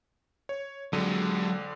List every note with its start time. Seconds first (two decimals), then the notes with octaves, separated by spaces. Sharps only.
0.49 C#5
0.93 F2 D3 F#3 G#3 D#7